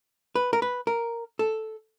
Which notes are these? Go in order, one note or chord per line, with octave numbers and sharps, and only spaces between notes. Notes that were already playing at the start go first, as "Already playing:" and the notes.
B4
A#4
B4
A#4
A4